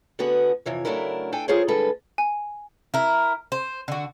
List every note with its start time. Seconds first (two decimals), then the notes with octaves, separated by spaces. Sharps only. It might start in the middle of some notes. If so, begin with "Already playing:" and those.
0.19 D3 B3 F#4 G#4
0.66 F2 C3 E3 C#5
0.85 C#3 F#3 A3 D4 E4 A#4
1.32 D4 A4 G5 G#5
1.48 F4 G#4 A#4 C5 C#5
1.68 D3 G3 G#3 A4 B4
2.18 G#5
2.94 E4 A#4
3.52 C5
3.88 D3 F#4